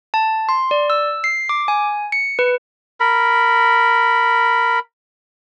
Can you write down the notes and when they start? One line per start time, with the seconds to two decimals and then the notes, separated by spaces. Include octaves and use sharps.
0.14 A5
0.49 C6
0.71 D5
0.90 E6
1.24 C7
1.49 D6
1.68 G#5
2.12 C#7
2.39 B4
3.00 A#4 B5